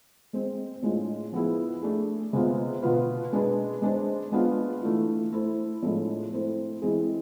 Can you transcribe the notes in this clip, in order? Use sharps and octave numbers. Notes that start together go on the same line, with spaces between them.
G#3 C4 G#4 C5
A2 G#3 D4 F4
F3 B3 E4 G#4
A3 D4 G#4
C3 G#3 B3 F4
B2 B3 F4 B4
G#3 D4 G#4 B4
G#3 D4 G#4 C5
G#3 B3 D4 F4
E3 A3 D4 F4
A3 E4 A4 C5
A2 F3 G#3 D4 A4
A3 C4 E4 A4 C5
E3 G#3 C4 E4 G#4